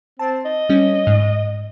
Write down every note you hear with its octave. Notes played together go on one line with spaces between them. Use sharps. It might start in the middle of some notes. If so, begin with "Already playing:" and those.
C4 A5
D#5
G3 C#4
G#2